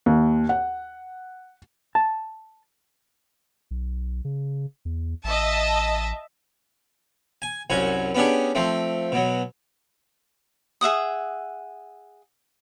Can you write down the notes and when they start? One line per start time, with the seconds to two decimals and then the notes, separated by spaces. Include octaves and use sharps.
0.06 D#2
0.49 F#5
1.95 A5
3.71 B1
4.25 C#3
4.85 E2
5.24 A1 D#5 E5 A5
7.42 G#5
7.70 C2 F#2 C#4 F#4 G#5
8.15 B3 C#4 D4 G4 G#4
8.55 F3 A3 C4
9.12 B2 F#3
10.81 G#4 E5 F#5 D#6